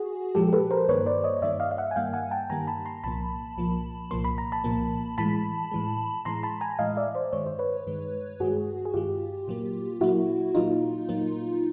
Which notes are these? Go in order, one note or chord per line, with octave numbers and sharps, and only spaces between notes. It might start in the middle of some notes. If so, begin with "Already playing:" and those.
Already playing: F#4 G#4
A#2 F3 G#3 G4 A4
A4 B4
A#4 C5
G2 D#3 G3 A#3 B4 C#5
C5 D5
C#5 D#5
G2 D#3 G3 A#3 D5 E5
D#5 F5
F5
E5 F#5
G#5
G2 D#3 G3 A#3 F5 G5
F#5 G#5
G5 A5
G2 D#3 G3 A#3 G#5 A#5
A5 B5
A#5 C6
C2 A#2 F3 A#3 A5 B5
C2 A#2 F3 A#3
C2 A#2 F3 A#3 C6
B5
A#5
A5 B5
C2 A#2 F3 A#3
A2 E3 G#3 A5 B5
A2 E3 G#3
A2 E3 G#3 A#5 C6
A5 B5
G#5 A#5
A2 E3 G#3 D#5 F5
D5 E5
C5 D5
G2 D#3 G#3 C#5
C5
B4 C#5
G2 D#3 G#3
G2 D#3 G#3 F#4 G#4
G#4
G2 D#3 G#3 F4 G4
A#2 F#3 A#3
A#2 F#3 A#3 E4 F#4
A#2 F#3 A#3 D#4 F4
A#2 F#3 A#3